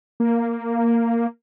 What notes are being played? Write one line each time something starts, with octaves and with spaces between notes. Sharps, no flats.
A#3